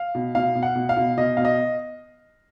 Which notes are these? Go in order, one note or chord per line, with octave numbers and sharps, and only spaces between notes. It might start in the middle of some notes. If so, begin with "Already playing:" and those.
Already playing: F5
B2
B2 F5
B2
F#5
B2
F5
B2
B2 D#5
B2 F5
D#5